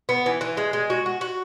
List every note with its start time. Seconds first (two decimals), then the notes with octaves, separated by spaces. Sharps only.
0.09 B3
0.26 E3
0.41 E3
0.57 G#3
0.73 G#3
0.90 F#4
1.06 F#4
1.21 F#4